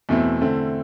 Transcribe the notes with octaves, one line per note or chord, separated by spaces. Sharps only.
E2 B2 A3 C4 E4
D3 A3 C4 E4